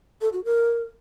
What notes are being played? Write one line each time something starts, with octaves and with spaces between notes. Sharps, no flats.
A4
F#4
A#4